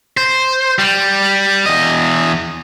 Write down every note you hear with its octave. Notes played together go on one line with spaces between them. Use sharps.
C5
G3
E2 D#5